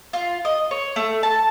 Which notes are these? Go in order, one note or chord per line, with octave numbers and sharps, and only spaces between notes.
F4
D#5
C#5
A3
A5